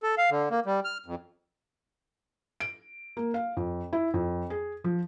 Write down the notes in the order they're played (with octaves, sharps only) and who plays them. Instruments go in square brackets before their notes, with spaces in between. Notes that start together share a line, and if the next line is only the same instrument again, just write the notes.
[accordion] A4
F5
D3
A#3
G3
F6
F2
[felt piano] D7
A#3
F5
F2
E4
F2
G#4
F3